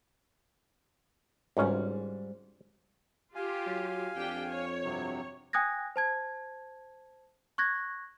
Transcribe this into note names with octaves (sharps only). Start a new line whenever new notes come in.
G#1 C#2 G#2 G3 C#4
F4 G4 F5 G#5
F#3
F2 D4 G4 G5
C#5
G2 C3 F#3
G5 G#5 D#6 F#6 G#6 A#6
C5 A5 G#6
C#6 F#6 G#6 A#6